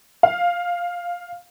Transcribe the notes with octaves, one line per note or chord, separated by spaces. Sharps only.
F5